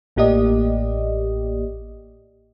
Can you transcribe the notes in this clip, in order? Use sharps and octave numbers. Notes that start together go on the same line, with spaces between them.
A1 A2 A#3 G4 D5 D#5